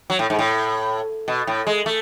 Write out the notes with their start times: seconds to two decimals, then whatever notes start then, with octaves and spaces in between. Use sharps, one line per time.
0.10 F#3
0.19 A2
0.30 G#2
0.39 A2
1.28 B2
1.47 A2
1.67 G#3
1.86 A3